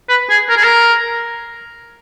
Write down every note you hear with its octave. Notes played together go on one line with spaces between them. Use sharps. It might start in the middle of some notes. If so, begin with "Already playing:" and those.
B4
G#4
A#4
G#4
A#4